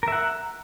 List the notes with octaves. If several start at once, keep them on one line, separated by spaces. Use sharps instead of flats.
A#4 E5 F#5